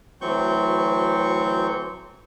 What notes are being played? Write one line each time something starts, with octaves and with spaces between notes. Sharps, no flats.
D2 E3 F#3 C4 C#6 G6